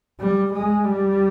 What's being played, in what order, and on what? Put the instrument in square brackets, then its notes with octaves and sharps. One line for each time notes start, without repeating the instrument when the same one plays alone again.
[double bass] G3
G#3
G3